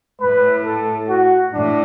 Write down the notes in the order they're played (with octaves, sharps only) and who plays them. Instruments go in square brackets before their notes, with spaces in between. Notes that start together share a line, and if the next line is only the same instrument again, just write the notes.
[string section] A2 [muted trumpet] B4
[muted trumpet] A4
F#4
[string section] A2 [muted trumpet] D4